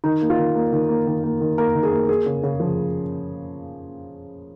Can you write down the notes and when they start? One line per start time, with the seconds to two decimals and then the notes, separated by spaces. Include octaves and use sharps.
0.04 D#3 D#4
0.21 A#3
0.30 F4
0.38 D#3
0.55 A#3
0.72 D#3
0.89 A#3
1.07 D#3
1.24 A#3
1.40 D#3
1.58 A#3 A#4
1.75 D#3
1.83 G#4
1.92 A#3
2.09 A#3 G#4
2.26 C#3
2.43 C#3
2.60 F3